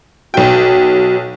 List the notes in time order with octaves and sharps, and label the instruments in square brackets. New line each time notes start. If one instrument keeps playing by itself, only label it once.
[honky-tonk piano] B1 G5 [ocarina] F#4